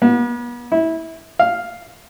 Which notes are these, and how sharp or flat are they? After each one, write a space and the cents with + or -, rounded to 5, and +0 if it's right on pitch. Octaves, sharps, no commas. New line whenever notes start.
B3 -40
E4 -20
F5 +0